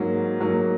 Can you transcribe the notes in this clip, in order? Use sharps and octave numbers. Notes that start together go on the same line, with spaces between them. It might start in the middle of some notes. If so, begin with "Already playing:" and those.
Already playing: G#2 F#3 A#3
G#2 F#3 A#3